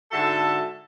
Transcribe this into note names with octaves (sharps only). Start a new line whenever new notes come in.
G#2 D3 F#4 A4 E5 A5